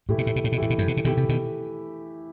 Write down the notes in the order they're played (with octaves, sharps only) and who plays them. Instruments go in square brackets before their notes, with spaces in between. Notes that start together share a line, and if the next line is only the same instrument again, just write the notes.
[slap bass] A2 [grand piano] E3 A3 E4 G4
[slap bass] B2
A2
B2
A2
B2
[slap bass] A2 [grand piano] E3 A3 E4 G4
[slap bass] B2
F#2 A2
B2
C3
[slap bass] B2 D#3 [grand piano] E3 A3 E4 G4
[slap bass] C3
B2 D#3